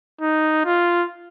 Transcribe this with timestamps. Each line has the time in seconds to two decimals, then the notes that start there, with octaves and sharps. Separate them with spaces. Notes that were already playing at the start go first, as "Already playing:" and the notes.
0.21 D#4
0.65 F4